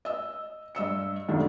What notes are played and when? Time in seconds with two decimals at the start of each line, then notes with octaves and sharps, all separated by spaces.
0.05 D#5 E6
0.75 G2 D#5 E6 C#7
1.28 B1 F#2 D3 D#3 G3